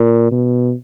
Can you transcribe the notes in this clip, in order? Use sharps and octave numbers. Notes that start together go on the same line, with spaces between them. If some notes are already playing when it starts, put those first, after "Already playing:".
Already playing: A#2
B2